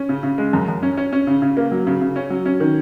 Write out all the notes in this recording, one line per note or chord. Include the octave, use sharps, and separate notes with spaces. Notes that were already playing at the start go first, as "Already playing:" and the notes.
Already playing: C#4
C#3
C#3
G#3
F#2
F#2
C#4
C#4
C#4
C#3
C#3
A#3
F#3
C#3
C#3
C#4
F#3
C#4
D#3